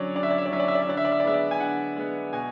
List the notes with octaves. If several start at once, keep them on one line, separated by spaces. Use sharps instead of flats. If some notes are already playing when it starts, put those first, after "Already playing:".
Already playing: D3 F#3 C#4 C#5 D5
D3 D5
E5
D5
E5
D5
F#3 C#4 E5
D5
E5
D5
E5
D3 D5
E5
D5
E5
D5
G#3 B3 E5
D5
G#5
D3 F#5
G#3 B3
B2 G#5